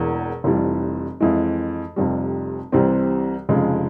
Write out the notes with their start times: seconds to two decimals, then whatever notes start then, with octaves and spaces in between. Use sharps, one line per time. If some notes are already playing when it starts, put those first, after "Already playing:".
Already playing: E1 E2 E3 A#3
0.44 F1 F2 E3 G3
1.20 F2 E3 G#3 E4
1.96 F1 F2 C3 G3
2.72 C2 C3 E3 G3 C4
3.49 F1 F2 C#3 F3 G#3